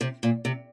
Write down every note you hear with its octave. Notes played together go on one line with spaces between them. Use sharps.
C3
A#2
C3